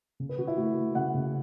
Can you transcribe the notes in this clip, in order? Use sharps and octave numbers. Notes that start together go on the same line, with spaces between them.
C#3
B4
C#3 F#4
E4
A3 F#4
A3
C#3 F#5
C#3